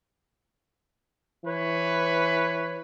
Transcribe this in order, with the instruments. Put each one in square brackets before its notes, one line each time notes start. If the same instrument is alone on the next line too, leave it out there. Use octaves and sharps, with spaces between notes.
[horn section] E3 B4 C#5